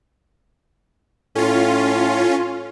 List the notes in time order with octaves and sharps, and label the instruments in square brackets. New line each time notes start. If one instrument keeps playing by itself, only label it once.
[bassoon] A2 [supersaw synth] C#4 F4